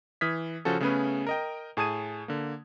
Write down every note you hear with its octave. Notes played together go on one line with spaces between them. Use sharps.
E3 D#6 F6 G#6 B6
C#3 F3 C#4 F#4 A4
C#3 A3 B3 C#4 G#4 B4
A#4 D#5 G5
A2 G#4 A5 D#6 G#6 D#7
D3 A#3